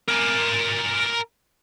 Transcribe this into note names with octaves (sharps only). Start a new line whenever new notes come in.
A#4 G#5